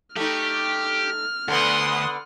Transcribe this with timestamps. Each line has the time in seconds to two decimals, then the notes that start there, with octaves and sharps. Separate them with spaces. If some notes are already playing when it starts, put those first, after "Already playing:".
0.16 A3 D#4 G4 F6
1.48 D2 D3 B3 F#5 C6 D#6